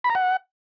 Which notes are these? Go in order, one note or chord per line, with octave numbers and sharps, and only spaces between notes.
B5
A#5
F#5